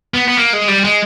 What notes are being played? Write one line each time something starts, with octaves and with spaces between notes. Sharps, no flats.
B3
B3
A#3
G#3
G3
G#3